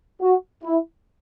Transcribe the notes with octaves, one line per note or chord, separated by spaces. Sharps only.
F#4
E4